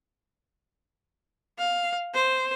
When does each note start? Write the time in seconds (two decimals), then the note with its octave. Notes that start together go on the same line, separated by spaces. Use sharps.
1.58 F5
2.14 C5